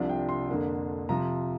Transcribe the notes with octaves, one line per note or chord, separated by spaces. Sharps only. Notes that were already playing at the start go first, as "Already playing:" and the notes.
Already playing: C2 C3 F3 D4
G5
C6
F2 D3 A#3 D4
C3 F3 A#5